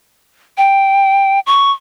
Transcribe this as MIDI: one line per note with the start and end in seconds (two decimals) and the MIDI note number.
0.57 1.40 79
1.46 1.72 85